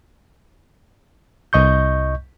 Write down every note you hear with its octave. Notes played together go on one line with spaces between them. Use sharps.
C2 D#5 C#6 G6